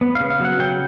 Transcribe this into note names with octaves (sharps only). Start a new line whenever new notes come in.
B3
C#3 F5
F5
F#3 F#5
C#3 G5